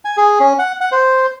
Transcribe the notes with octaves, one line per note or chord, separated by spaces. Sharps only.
G#5
G#4
C#4
F#5
F#5
C5